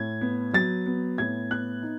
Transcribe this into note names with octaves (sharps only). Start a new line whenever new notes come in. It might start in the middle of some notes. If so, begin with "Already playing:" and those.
Already playing: A2 G#6
B3
F#3 A6
B3
A2 G#6
B3 F#6
D#4